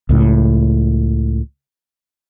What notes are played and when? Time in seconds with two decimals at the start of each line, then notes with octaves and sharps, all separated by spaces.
0.09 C#2 A2